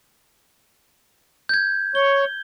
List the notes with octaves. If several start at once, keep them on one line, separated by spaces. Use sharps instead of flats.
G6 G#6
C#5 G7